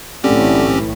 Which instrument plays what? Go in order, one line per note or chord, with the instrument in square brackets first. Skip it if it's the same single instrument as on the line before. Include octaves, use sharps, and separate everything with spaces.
[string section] B1 A2 E3 [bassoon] D3 [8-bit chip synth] C4 C#4 G4